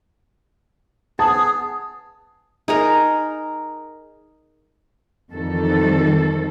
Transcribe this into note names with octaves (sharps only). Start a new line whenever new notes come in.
B3 G#4 A5
D#4 G#4 A#4
F2 D#3 E3 G3 A4